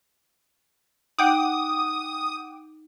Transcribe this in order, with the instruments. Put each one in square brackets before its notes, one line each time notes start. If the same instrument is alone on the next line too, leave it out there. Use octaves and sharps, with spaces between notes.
[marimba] D#4 [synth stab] F#5 G5 D6 [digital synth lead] D#6